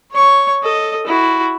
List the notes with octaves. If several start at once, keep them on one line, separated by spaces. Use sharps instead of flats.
C#5 C#6
A4 D#5
E4 F#4